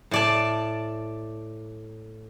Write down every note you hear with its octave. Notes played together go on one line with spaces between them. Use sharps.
A2 D5 A5